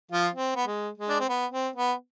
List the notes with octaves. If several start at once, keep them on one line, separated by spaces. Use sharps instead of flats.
F3 F4
C4
B3
G#3
G#3
D4
C4
B3
C4
B3